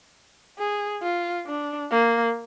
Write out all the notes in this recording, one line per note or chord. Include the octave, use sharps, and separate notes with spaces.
G#4
F4
D4
A#3